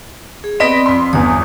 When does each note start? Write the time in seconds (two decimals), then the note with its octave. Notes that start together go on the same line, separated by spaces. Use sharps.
0.44 G#4
0.60 B3 C4 D5 D#5 B5 B6
0.86 F2 C6
1.13 G1 E2 D#6